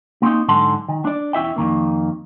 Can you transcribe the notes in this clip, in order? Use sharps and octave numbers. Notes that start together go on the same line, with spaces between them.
A#3 C4 C#4 D#4
G#2 D3 F#3 A5 C6
D#3
D4 D5
E2 C#4 E4 E5 G5
F2 D#3 A#3